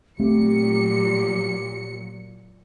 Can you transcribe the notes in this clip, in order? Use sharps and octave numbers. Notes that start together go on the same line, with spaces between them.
A#2 F#3 A3 C4 G4 C#7